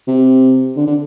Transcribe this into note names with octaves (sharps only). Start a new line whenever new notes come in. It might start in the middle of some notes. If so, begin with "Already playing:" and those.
C3
D3
D3